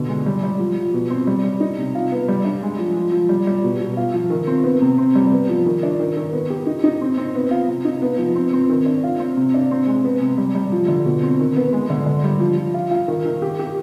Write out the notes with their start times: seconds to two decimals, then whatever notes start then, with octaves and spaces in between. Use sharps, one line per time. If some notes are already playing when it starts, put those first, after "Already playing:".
Already playing: B2 D3
0.09 G#3
0.26 G3
0.43 G3
0.59 F3
0.77 F3
0.94 B2
1.10 C4
1.27 G3
1.44 G3
1.60 D#4
1.78 C3
1.95 F4
2.12 B3
2.28 G3
2.45 D4
2.62 G#3
2.79 F3
2.96 F3
3.12 F3
3.29 G3
3.47 G3
3.64 B2
3.81 B2
3.97 F4
4.14 F3
4.30 D#3
4.47 C4
4.64 B3
4.82 C3
4.98 C4
5.15 G3
5.32 B3
5.49 F3
5.66 D#3
5.83 D4
6.00 D#3
6.17 D#3
6.33 B3
6.50 G4
6.67 D#4
6.84 D#4
7.01 C4
7.18 C4
7.35 B3
7.51 F4
7.68 C3
7.85 D#4
8.02 B3
8.18 F3
8.35 C4
8.53 C4
8.69 D#3
8.86 D4
9.04 F4
9.20 C4
9.37 C3
9.54 D4
9.71 C4
9.87 G#3
10.04 B3
10.21 C3
10.38 G3
10.55 G3
10.72 F3
10.88 D3
11.05 B2
11.23 C4
11.39 D#3
11.56 B3
11.73 G#3
11.90 D3
12.06 D3
12.24 G3
12.40 F3
12.57 F3
12.74 F4
12.91 F4
13.08 D#3
13.25 D#3
13.42 G4
13.59 G4